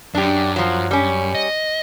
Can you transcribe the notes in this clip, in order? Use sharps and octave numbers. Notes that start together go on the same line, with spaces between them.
F#2 D4 G4
F3 F#3
G3 C#4
D#5